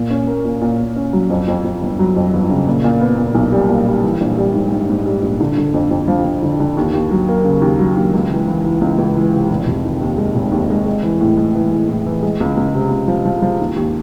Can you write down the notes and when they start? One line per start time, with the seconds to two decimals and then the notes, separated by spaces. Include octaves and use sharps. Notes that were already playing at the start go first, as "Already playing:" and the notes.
Already playing: A#2
0.10 C#4
0.27 A#3
0.45 A#2
0.61 A#2
0.80 A#2
0.96 C#4
1.13 F#3
1.30 F2
1.48 F2
1.65 F2
1.81 G1
1.99 F#3
2.16 F2
2.33 G1
2.50 C#3
2.67 A#2
2.84 A#2
3.01 B3
3.18 A#2
3.35 B1
3.52 G3
3.69 A#2
3.86 G3
4.04 E3
4.21 A#1
4.38 G3
4.54 G#2
4.72 G#2
4.89 G#2
5.05 G3
5.22 A#1
5.41 D3
5.58 D3
5.74 F2
5.91 F2
6.08 F3
6.25 F3
6.43 D3
6.60 D3
6.77 D#2
6.93 D#2
7.11 F#3
7.28 A#3
7.44 C#3
7.62 D#2
7.79 F#3
7.96 D#2
8.13 C#2
8.30 E3
8.48 E3
8.64 E3
8.81 C#2
8.98 C#2
9.15 E3
9.33 C3
9.50 F1
9.67 F1
9.84 D#3
10.01 D#2
10.18 G#3
10.35 F1
10.52 D#2
10.70 G#3
10.86 G#3
11.03 E3
11.21 A2
11.37 G#3
11.55 E3
11.72 A2
11.89 A2
12.06 E3
12.23 G#3
12.40 C#2
12.57 C#2
12.75 C3
12.91 C#2
13.08 F3
13.25 F3
13.42 F3
13.60 D#2
13.76 D#2